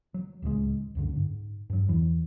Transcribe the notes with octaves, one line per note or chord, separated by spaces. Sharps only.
F#3
D1 C#2 C3 G#3
C#2 F#2 D3
G#2
G2 F#3
E2 E3 F#3